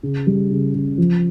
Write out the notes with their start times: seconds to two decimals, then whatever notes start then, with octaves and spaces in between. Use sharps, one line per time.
0.03 C#3
0.27 G3
0.51 C#3
0.74 C#3
0.98 F3